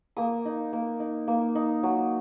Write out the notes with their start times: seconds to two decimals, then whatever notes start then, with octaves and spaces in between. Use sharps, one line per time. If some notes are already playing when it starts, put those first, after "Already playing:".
0.17 A#3 D#6
0.45 D#4
0.73 A#3
1.00 D#4
1.28 A#3
1.55 D#4
1.83 F#3